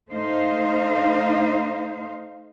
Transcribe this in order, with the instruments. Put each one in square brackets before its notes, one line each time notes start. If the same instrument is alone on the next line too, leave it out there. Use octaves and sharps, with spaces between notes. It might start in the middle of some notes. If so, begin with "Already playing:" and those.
[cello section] A3 D#4 C5 F5